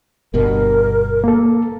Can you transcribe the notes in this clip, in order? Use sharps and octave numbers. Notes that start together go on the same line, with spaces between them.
G1 G2 B2 A#4
A#3 A4